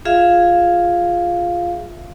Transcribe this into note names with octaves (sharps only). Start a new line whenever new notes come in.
F4 G#4 E5 F5